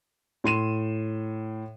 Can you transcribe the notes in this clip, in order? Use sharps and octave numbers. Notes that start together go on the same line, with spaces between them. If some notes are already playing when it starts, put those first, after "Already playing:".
A2 C6 D#7 E7